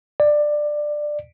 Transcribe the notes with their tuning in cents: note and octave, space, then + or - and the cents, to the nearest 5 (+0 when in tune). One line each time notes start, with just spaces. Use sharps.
D5 +15